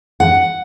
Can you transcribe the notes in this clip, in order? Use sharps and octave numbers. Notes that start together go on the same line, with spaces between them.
F#5